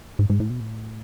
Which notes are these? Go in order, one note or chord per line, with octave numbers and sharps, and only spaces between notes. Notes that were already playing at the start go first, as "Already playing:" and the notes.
G#2
G#2
A2
B2
A2